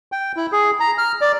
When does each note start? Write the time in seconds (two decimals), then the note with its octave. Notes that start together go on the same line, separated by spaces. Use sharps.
0.12 G5
0.36 E4
0.52 G#4
0.80 A#5
0.98 F6
1.21 D5